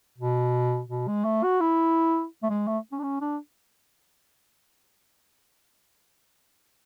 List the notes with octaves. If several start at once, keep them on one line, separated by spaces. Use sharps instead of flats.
B2
B2
G#3
A3
F#4
E4
A3
G#3
A3
C#4
D4
C#4
D4